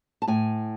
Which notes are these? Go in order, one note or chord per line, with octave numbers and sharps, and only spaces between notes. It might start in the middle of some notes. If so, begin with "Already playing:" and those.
A5
A2 G#5